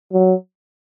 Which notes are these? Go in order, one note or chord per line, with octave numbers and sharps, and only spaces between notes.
F#3